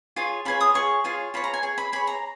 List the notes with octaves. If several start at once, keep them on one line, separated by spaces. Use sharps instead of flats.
F4 G#4 C#5
F4 G#4 C#5 B5
D#6
F4 G#4 C#5 C#6
F4 G#4 C#5
F4 G#4 C#5 B5
A#5
G#5
G#4 C#5
B5
G#4 C#5 B5
A#5